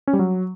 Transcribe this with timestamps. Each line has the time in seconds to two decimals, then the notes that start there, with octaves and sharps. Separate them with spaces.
0.07 C#4
0.13 G3
0.19 F#3